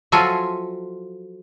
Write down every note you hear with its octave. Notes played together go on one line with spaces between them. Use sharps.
F3 F#3 F4 A4 E5 G#5